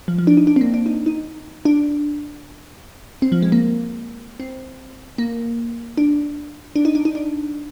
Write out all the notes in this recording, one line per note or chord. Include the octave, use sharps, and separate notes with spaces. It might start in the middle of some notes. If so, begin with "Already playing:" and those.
F3
F3
D4
D#4
D4
C4
A#3
D4
D#4
D#4
D4
C4
F3
G#3
A#3
C4
A#3
D4
D4
D#4
D4
D#4
D4